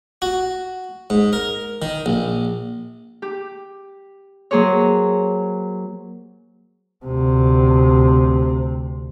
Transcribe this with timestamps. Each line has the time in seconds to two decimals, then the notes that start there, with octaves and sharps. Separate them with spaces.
0.22 F#4
1.10 G#2
1.33 A#4
1.82 D#3
2.06 A#1
3.22 G4
4.51 F#3 A#3 G#4 C5 C#5
7.06 D2 C3